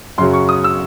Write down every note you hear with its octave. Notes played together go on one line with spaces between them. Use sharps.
F#2 C#3 F#3 C6
C#6
D#6
E6